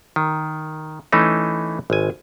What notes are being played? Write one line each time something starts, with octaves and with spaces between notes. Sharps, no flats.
D#3
E3 A3 C#4 D#4
G#1 G#5